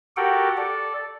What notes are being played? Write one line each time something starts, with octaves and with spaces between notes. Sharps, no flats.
F#4 G4 A4 A#4 F#5 G5
A4 D5